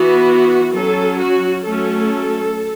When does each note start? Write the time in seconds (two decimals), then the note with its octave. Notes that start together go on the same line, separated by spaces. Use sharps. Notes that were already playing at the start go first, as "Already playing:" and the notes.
Already playing: E3 B3 F#4
0.77 F#3 C#4 A4
1.21 F#4
1.65 F#3 A3 C#4 A4